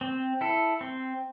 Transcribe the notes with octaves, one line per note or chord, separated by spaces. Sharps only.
C4
E4 A4
C4